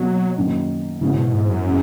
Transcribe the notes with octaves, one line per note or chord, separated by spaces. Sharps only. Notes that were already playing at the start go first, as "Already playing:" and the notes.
Already playing: B2 F#3 A#3 D#4
F#2 D#3 A#3
G#2 C#3 E3 B3 F#4
B2
G#2
F#2
C#3 E3 G#3 C#4